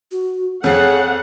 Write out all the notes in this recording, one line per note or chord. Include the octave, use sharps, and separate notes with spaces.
F#4
F2 F3 G#4 C#5 F#5 C7